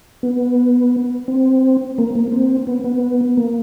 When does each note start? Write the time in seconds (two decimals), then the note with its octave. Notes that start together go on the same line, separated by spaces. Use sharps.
0.23 B3
1.28 C4
1.98 A#3
2.15 A#3
2.32 C4
2.67 B3
2.84 B3
3.37 A#3